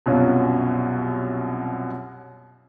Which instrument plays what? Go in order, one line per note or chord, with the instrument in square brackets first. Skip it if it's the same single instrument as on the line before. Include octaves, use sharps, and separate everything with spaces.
[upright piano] C2 F#2 B2 F#3 C#4 F4